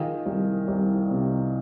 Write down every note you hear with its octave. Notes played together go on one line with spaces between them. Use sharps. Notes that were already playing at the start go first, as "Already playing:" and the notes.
Already playing: D#3 F4 G#4
C2
C2
C3